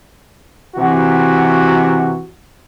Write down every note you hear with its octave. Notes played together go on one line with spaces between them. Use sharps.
C3 E3 F#4